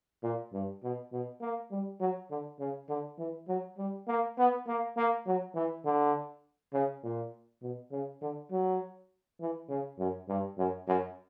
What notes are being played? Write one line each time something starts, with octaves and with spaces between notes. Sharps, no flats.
A#2
G2
B2
B2
A#3
G3
F#3
D3
C#3
D3
E3
F#3
G3
A#3
B3
A#3
A#3
F#3
E3
D3
C#3
A#2
B2
C#3
D3
F#3
E3
C#3
F#2
G2
F#2
F#2